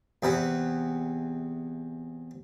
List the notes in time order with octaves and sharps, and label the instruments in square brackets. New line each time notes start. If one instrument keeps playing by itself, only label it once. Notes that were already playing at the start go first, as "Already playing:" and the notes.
[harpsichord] E2 C3 B4